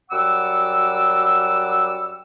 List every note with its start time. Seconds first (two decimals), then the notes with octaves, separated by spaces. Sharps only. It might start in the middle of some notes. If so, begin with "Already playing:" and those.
0.11 F#2 G3 F#5 D6 E6